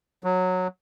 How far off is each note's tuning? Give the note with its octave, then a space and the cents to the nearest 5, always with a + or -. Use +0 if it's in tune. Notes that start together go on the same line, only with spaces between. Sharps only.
F#3 -15